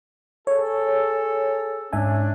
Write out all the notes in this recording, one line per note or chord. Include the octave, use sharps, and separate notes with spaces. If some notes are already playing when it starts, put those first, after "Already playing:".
G#4 A4 C#5
G#2 C#4 D4 E5 G#5